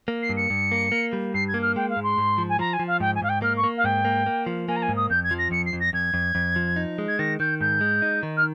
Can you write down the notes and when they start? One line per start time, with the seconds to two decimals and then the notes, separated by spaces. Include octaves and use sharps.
0.08 A#3
0.22 C7
0.29 G2
0.36 C#7
0.50 G2
0.72 A#3
0.92 A#3
1.13 G3
1.34 G2 C7
1.48 G#6
1.54 A#3
1.61 F6
1.76 G#3 G5
1.89 F5
1.96 G#2
2.03 C6
2.18 G#2
2.38 F3
2.49 G#5
2.59 F3 A#5
2.73 G#5
2.79 F3
2.87 F5
3.00 G#2 G5
3.15 G#5
3.22 G#2 F5
3.29 G5
3.42 A#3 F6
3.56 C#6
3.64 A#3
3.77 F5
3.84 G#2 G5
4.05 A#3
4.26 A#3
4.46 F3
4.68 A#3 G#5
4.76 A#5
4.82 G#5
4.89 G#2
4.96 D#6
5.10 F2 G6
5.23 G#6
5.31 F3
5.38 A#6
5.51 F2 C#7
5.65 C7
5.73 F2
5.80 A#6
5.93 F2 G#6
6.14 F2
6.35 F2
6.56 F3
6.76 D#4
6.98 G#3
7.08 G#6
7.19 D#3 A#6
7.39 D#3 G6
7.61 G#2 G6
7.81 G#3
8.02 D#4
8.23 D#3
8.37 F6